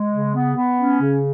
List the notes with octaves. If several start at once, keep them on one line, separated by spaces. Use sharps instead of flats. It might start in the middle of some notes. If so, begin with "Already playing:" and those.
Already playing: G#3
C#3
B3
B3
C#4
C#3